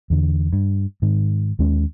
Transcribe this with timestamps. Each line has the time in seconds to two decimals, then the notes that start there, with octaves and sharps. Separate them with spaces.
0.10 E2 D3
0.53 G2
1.02 G#2 D#3
1.59 D#2 G#3 C#4